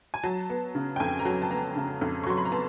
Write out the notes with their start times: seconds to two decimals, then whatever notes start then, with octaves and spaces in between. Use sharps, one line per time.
0.14 G#5
0.24 F#3 A5
0.50 B3
0.75 C#3
0.96 G5
1.00 F2 G#5
1.19 A#5
1.25 F#3 A5
1.42 A5
1.50 B3 A#5
1.76 C#3
2.01 F2
2.24 C#6
2.27 F#3 C6
2.38 B5
2.45 A#5
2.52 B3 A5